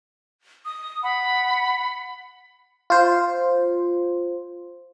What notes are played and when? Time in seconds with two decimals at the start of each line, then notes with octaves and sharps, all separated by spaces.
0.65 D#6
1.03 F#5 B5
2.90 F4 C5